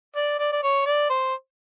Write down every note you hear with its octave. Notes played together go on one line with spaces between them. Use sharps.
D5
D5
D5
C#5
D5
C5